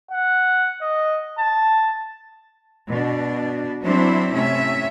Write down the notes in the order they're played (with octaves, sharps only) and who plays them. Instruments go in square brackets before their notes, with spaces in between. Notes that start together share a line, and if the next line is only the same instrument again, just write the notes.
[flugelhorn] F#5
D#5
A5
[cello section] B2 D4
F#3 C4 D4 E4 C5
C3 A3 C#4 E5